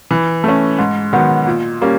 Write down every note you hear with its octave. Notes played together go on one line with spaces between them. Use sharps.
E3
A3 C#4
G#2
D#3 F#3 B3
A#2
G3 A#3 C#4